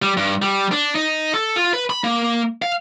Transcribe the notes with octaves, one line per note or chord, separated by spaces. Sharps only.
G3
G2
G3
D4
D#4
A4
F4
B4
B5
A#3
F5